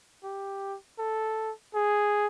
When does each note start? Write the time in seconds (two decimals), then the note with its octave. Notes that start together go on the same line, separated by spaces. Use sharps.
0.24 G4
0.99 A4
1.74 G#4